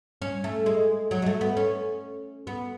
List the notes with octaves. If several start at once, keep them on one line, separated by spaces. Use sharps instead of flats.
C#4
A3
G#3
F#3
G#3
A3
B3
C#4
B3